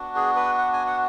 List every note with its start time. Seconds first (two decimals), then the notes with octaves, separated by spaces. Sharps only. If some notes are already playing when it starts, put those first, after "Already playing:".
Already playing: B3 D4 F#4
0.15 G#4
0.36 B4
0.58 F#5
0.73 G#5
0.87 F#5